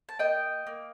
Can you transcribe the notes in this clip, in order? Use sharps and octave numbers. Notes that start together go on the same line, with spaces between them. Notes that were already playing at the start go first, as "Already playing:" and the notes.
A5
A#3 D#5 G5
A#3